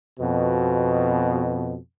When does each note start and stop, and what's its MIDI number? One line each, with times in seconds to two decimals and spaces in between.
0.19 1.77 41
0.19 1.77 47